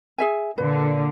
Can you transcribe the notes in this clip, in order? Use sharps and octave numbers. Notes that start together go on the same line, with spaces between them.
G#4 E5 G#5
A#2 D3 B4